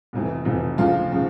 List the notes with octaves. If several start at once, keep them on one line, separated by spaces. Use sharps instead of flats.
F1 F2 E3
F1 F2 E3
D2 C#3 F3 F4
C#3 F3